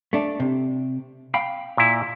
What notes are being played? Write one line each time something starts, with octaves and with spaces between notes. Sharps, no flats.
A3 D4
C3
F5 G5 B5
A#2 E4